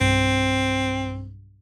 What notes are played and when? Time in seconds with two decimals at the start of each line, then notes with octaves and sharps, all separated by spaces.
0.01 B1 G2 C4